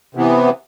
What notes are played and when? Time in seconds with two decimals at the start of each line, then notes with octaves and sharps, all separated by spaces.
0.15 C3 E3 B3